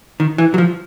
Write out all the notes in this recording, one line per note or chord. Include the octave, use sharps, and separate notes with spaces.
D#3
E3
F#3
F3